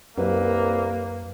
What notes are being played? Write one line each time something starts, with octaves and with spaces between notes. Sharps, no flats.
C2 F#2 A#3 B4